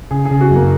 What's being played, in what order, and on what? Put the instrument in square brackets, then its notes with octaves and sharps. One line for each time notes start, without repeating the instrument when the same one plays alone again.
[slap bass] C#3 [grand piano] G#4
[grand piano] G#4
[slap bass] C#3
[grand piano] F#4
[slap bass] F#2 [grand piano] A#3